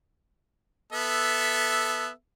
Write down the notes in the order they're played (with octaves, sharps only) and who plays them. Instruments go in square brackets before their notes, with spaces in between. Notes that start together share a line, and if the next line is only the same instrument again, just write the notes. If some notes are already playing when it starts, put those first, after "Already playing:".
[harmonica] B3 A4 E5